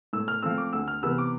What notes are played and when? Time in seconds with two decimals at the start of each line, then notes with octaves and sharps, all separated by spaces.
0.13 A2 E6
0.28 F6
0.43 F3 A3 C4 E6
0.58 D6
0.73 D2 E6
0.88 F6
1.03 C3 E3 B3 E6
1.18 D6